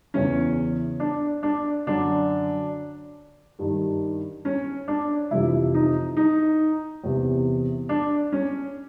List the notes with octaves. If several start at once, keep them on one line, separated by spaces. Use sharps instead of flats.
E2 C#3 E3 C#4
D4
D4
F#2 D3 D4
G2 D#3
C#4
D4
F2 C3 E3 E4
D#4
D#4
E2 C3 E3
D4
C#4